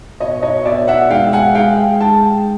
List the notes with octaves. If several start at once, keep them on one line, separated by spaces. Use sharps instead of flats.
B2 C#5 D#5
C#5 D#5
B2 D5 E5
E5 F#5
G#3 F5 G5
F#5 G#5
G#3 F5 G5
G#3 G5 A5